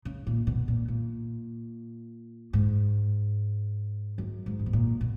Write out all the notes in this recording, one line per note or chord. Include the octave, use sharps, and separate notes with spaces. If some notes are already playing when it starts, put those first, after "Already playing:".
C#3
A#2
B2
A#2
A#2
G#2
F#2
G#2
C#3
B2
A#2
B2